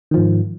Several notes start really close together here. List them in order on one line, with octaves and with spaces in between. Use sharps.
D#3 F3 G#2